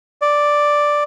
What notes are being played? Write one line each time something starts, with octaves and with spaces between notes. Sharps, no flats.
D5